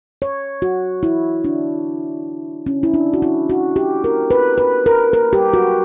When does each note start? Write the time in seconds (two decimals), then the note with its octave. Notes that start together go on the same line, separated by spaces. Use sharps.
0.22 C#5
0.62 F#4
1.03 E4
1.44 D4
2.66 C#4
2.83 E4
2.94 D4
3.14 F#4
3.22 E4
3.50 F#4
3.76 G4
4.04 A#4
4.31 B4
4.58 B4
4.86 A#4
5.13 A#4
5.33 G4
5.54 F#4